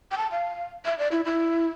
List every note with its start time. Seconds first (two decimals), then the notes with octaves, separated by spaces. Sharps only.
0.11 G5
0.18 A5
0.31 F5
0.85 E5
0.99 D5
1.12 E4
1.25 E4